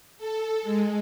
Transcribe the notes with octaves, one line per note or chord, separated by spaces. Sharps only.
A4
G#3